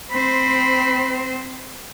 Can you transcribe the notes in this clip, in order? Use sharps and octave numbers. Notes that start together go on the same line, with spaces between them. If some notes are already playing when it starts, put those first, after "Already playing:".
C4 C5 B5